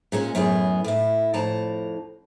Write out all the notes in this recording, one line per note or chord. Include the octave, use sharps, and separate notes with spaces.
A#2 G#3 C#4
F#2 A2 B3 G#4
A2 E4
F2 A2 A5 A#5